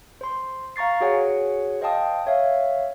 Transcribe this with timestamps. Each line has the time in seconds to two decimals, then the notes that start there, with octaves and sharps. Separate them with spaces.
0.21 C5 C6
0.76 F5 A#5 C#6 A6 C7
1.00 F#4 G#4 C#5 F#5 G#5
1.81 C5 D#5 F5 G5 A5 D#6
2.27 C#5 E5 F5